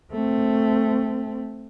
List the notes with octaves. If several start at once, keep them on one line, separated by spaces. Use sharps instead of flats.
A3 C4